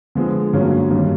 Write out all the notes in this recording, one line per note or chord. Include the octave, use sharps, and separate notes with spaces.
D3 F3 G#3 B3
G2 D3 F#3 A#3 C#4
G2 D#3 G3